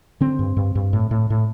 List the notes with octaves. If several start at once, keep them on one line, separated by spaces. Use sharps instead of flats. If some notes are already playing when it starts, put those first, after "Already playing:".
D3 C4
G2
G2
G2
A2
A2
A2